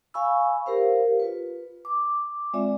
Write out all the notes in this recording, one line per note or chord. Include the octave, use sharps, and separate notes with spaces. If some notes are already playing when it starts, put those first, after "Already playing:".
F5 G#5 B5 C#6 E6
G4 A#4 C5 F5
F4 B4
D6
G#3 C4 F4 D5 E5